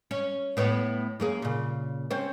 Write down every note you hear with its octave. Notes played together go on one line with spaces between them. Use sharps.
C#4
A2 B3 C#5
F#2 A#3 G#4
A#2 C#3
C4 C#4 C5